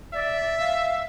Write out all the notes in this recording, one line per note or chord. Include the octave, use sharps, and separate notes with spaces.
D5 E5
F5